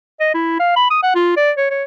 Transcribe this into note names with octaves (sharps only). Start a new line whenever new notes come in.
D#5
E4
F5
B5
D#6
F#5
F4
D5
C#5
C#5